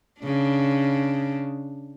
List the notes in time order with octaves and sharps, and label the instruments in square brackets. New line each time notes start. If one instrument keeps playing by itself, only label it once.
[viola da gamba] C#3 D4